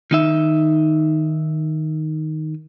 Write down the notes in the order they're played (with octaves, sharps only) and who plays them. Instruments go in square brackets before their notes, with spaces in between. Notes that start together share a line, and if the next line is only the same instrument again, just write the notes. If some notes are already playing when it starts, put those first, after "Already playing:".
[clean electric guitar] D#3 D#4 E5